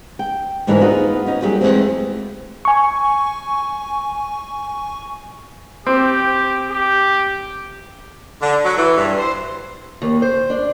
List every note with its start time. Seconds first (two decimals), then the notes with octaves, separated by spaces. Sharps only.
0.19 G5
0.67 D2 G#2 E3 D4 E4 A#4
0.80 B3 D#4 F4 F#4 G#4
1.26 B3 C#4 D#4
1.42 F#3 G3 A#3 D#4 G4 G#4
1.61 E2 G#2 G#3 A3 C4
2.65 G#5 C#6
5.87 C4 G4
6.71 G4
8.41 D3
8.63 F#3
8.76 E3
8.96 G2
9.16 C5
10.02 D#2
10.22 C5
10.50 D4